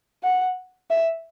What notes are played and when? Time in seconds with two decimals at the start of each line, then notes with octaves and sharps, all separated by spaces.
0.23 F#5
0.90 E5